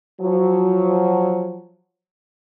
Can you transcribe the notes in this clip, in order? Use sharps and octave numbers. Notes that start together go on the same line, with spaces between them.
F3 F#3